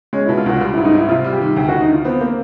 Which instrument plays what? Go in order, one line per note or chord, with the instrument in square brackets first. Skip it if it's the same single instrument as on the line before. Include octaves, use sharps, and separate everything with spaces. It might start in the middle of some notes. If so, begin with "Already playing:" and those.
[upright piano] G#3 [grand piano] C#4
[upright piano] B2 [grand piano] E4
[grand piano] F4
[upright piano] C#2 [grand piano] F#4
[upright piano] G3 [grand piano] F4
[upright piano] G#2 [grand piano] E4
[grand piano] D#4
[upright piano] G#2 [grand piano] E4
[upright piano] C3 [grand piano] F4
[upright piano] G3
[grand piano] G4
[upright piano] D#3
[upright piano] D2 [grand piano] G4
[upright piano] D2 [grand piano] F#4
[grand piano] D#4
[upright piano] D3 [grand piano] F4
[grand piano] B3 [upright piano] C4
[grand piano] A#3 [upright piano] C4